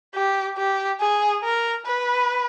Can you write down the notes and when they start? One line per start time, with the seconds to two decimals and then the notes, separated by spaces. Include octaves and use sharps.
0.15 G4
0.57 G4
1.00 G#4
1.44 A#4
1.86 B4